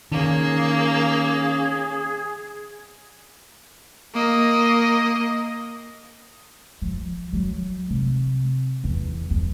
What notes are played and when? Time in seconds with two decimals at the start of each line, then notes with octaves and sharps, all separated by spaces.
0.12 D#3 A#3 C#4 G#4
4.14 A#3 D#5
6.82 F3
7.33 F#3
7.90 C3
8.84 E2
9.30 E2